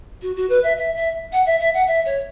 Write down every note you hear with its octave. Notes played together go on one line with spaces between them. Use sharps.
F#4
F#4
B4
E5
E5
E5
F#5
E5
E5
F#5
E5
C#5